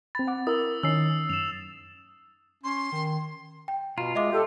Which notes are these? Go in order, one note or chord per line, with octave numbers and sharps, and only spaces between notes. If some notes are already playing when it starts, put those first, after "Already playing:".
C4 B5 A6
F#5 D6
E4 A#4 D#6 E6
D#3 C#4 D#4 E6 C7
F#2 E7 F7
C#4 C6
D#3
G5
B2 F4 A#5
G#3 D#5 E5 D6
G4 A4